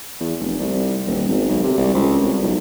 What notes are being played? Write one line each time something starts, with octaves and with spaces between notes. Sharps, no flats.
E2
F1
C2
D#1
G#1
B1
C3
C2
C#2
C2
B1